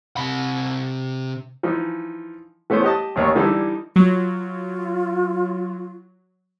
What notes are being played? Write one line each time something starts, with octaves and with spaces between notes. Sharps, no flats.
C3 B5
E3 F3 D#4
E3 A3 B3 C#4 C5
G4 D#5 A5
A1 D#2 C#4 C#5
D3 E3 G3 D#4 E4 A4
F#3 F4